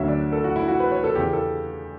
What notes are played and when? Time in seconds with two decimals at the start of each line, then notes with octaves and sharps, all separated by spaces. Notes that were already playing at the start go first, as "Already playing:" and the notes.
Already playing: D2 D3 F#3 C#4 F#4 E5
0.08 D5
0.33 A4
0.44 F#4
0.56 E4
0.68 F#4
0.80 B4
0.92 C#5
1.04 A4
1.15 E2 C#3 E3 G4
1.33 A4